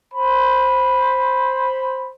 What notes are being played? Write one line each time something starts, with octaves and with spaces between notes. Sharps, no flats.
C5 B5